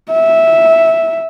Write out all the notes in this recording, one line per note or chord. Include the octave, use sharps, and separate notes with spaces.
E5